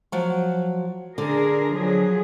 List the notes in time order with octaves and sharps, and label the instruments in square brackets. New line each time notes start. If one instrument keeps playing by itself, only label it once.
[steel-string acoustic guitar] F3 F#3
[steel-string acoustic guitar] D3 [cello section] D4 G#4 A#4
[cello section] F3 F#3 G#4